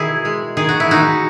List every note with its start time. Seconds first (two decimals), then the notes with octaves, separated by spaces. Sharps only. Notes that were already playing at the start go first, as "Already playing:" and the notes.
Already playing: B2 D#3 E4 F#4 G#4
0.25 G#3
0.57 D#3 G#4
0.69 F#4
0.80 E4
0.89 G#3 D#4 F#4